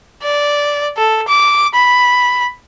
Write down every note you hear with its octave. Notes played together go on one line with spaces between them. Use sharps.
D5
A4
D6
B5